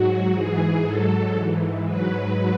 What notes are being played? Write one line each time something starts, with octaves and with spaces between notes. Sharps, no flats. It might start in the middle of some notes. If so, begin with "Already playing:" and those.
Already playing: G#2 F#3 F#4
G#2 E3 G#4
G#2 F#3 A4
G#2 E3
G#2 F#3 B4